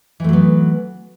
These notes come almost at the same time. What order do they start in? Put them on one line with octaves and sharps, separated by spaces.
E3 A3 F#3 B3